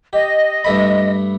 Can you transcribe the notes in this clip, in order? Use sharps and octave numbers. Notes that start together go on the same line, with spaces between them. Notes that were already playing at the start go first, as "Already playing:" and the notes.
G4 D#5
G2 A3 B5